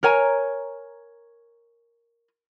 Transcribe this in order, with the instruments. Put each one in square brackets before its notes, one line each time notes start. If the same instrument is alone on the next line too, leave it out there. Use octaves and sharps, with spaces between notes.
[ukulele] A#4 C#5 G#5 A#5